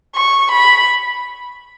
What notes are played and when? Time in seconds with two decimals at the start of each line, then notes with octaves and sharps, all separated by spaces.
0.16 C#6
0.52 B5